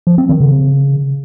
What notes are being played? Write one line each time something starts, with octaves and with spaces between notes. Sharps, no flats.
F3
C4
D#3
C#3